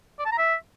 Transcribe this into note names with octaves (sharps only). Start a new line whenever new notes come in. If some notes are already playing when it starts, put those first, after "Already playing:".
D5
A5
A#5
E5